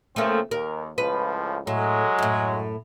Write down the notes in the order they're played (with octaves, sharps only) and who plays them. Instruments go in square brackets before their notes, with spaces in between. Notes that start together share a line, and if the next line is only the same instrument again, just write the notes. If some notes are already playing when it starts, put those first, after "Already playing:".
[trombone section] C#3 F3 C4 [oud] A3 A#3
[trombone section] D#2 [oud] A#4
[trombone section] C#2 A2 F3 [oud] B4
[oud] A2 [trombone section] F#3 G#3
[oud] F#2 A2